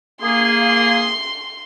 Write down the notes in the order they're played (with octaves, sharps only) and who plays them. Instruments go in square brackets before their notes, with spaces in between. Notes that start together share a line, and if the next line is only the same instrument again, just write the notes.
[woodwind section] A#3 G#4 [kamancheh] C6